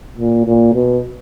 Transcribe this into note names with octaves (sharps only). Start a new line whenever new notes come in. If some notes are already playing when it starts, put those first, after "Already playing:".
A#2
A#2
B2